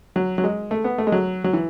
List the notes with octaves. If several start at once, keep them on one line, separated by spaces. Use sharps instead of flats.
F#3
F#3
G#3
A3
B3
A3
G#3
F#3
F#3
E3